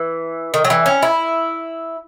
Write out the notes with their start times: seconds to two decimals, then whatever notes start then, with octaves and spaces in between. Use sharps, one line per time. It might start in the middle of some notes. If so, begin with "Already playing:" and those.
Already playing: E3
0.54 D#3
0.65 F#3
0.70 E3
0.86 C#4
1.03 E4